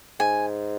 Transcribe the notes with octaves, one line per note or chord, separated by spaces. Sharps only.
G#2 G#5